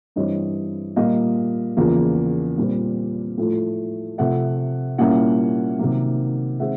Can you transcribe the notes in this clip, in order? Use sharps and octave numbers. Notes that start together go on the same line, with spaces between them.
G2 E3 G3 C4 C#5 D#5
A#2 G3 A#3 D#5 F5
E2 C#3 F3 A#3
A#2 G3 C4
A2 F3 A3
C3 F3 A3 E5 F#5
A#2 G3 A#3 C#4 E4 E5 F#5
C3 D#3 F#3 A#3
D#3 G#3 C4 E5 F#5